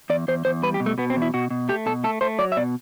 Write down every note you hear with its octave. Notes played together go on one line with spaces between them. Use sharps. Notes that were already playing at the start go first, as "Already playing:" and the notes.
E2 D5
E2 C5
E2 C5
G3 B4
G4
B2
A3
B2 B3
C4
E2
E4
B2 F#4
B2
A3 G4
B2 A4
A3 A4
A3 C5
F#3 D5
E5
B2 D5